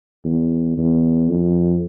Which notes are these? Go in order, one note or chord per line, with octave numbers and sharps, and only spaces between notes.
E2
E2
F2